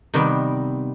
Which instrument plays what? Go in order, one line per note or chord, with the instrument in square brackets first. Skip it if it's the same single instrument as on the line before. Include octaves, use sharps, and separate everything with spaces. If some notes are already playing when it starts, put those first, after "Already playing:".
[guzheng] C3 D#3 G3 B3 C4